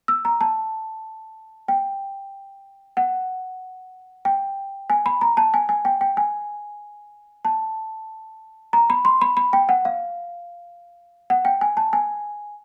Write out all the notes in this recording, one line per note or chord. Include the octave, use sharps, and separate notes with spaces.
E6
A#5
A5
G5
F#5
G5
G#5
B5
A#5
A5
G#5
G#5
G5
G5
G#5
A5
A#5
B5
C6
B5
B5
G5
F#5
F5
F#5
G5
G#5
A5
G#5